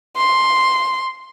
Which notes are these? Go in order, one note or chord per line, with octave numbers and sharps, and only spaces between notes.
C6